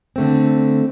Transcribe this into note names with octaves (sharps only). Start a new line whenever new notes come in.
D3 A3 C4